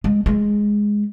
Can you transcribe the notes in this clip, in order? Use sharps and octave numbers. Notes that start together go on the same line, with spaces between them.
G#3
G#3